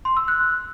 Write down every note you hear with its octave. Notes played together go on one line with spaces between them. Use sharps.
C6
E6
F#6